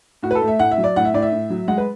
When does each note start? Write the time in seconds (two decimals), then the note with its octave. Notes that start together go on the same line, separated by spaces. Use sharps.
0.23 A2 F#4
0.31 B4
0.35 A4
0.42 A3
0.48 E5
0.59 A2 F#5
0.71 E5
0.78 F#3
0.84 D5
0.96 A2 F#5
1.05 E5
1.14 A2 D5
1.22 E5
1.32 A2
1.50 F#3
1.68 G#3 F#5
1.78 B4